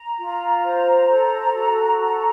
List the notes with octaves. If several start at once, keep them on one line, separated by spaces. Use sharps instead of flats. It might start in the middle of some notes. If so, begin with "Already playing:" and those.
Already playing: A#5
F4
C5
A4
F#4
A4